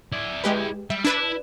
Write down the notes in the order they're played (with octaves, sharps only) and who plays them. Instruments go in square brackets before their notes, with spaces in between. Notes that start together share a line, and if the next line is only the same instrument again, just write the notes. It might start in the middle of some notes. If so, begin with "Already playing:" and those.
[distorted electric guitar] E4 D5
[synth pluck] G#3 G4 B4
[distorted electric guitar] G3 [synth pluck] E5
[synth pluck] D4 B4 [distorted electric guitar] E4